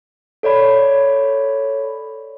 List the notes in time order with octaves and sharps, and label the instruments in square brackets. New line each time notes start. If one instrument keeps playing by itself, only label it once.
[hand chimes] A4 C#5 D5 B5